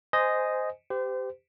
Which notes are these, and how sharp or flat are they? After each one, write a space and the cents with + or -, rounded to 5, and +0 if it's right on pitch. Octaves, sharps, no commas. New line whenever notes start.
C5 -15 D#5 +0 G#5 +0
G4 +0 C5 -35